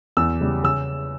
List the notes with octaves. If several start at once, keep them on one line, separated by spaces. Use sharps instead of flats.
E2 E6
C#3 G3
C#3 E6